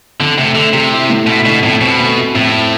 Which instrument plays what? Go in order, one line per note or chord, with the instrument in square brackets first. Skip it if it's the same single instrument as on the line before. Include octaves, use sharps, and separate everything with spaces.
[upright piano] F2 [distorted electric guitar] D3
[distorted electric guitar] C3 [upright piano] A3
[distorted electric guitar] D3 [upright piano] A3
[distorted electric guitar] C3 [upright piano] G3
[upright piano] E4
A2
[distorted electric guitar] B2 [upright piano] E4
[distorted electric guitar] B2 [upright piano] D3
[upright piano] F2 [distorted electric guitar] A2
[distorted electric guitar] B2 [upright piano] C4
[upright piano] D2
C3
[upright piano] F2 [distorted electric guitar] A2
[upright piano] C4